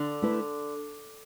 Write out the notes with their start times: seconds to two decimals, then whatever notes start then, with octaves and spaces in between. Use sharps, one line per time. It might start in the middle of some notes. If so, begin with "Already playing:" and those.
Already playing: D3
0.22 A3 E4 B4